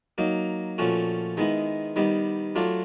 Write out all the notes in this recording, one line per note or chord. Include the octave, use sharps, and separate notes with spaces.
F#3 A#3 D#4
A#2 F3 A3 C#4 F#4
D#3 G#3 B3 E4
D#3 G3 B3
F#3 A3 D4 F4